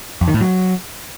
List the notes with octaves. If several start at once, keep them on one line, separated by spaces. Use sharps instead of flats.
F2
D#3
A2
F#3